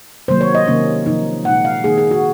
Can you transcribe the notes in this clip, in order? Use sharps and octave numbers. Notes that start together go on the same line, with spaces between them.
C3 D#3 F#3 A#3 C5
C#5
D#5
C3 D#3 A#3 C#4
C3 F3 A#3 D#4
A#2 G#3 D#4 F#5
F5
D#3 A#3 D#4 G#4
G#4
F#4